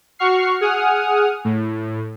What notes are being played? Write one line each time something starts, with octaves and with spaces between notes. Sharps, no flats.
F#4 C#6 F6 C7
G#4 F#5 D#6 F6
A2